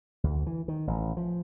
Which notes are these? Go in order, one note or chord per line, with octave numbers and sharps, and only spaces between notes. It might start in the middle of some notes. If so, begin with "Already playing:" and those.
D2
E3
D#3
A1
F3